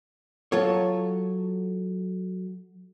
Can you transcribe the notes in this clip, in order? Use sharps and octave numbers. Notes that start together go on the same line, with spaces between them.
F#3 F4 A4 C#5